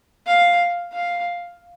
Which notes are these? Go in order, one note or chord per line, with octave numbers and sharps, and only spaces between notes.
F5
F5